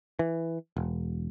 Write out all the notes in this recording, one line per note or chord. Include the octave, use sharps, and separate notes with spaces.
E3
E1